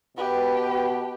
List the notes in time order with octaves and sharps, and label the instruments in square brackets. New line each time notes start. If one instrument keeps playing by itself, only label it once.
[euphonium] B2 [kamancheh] G4 B4